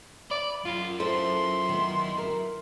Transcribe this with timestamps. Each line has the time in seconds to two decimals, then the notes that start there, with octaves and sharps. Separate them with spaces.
0.31 D5 B5
0.65 F#2 F4
1.00 E4 F4 A4 C5 C6
1.69 D#3 B3
2.18 A#4